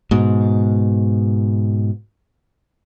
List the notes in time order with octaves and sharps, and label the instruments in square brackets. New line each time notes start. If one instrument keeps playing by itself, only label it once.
[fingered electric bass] G#2 B2